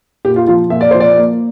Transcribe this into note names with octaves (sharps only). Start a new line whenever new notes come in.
A#2 G4
F4
F3 F4
A#2 E5
D5
F3 C5
D5
A#3